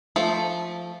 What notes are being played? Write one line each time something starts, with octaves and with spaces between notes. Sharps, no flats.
F3 A3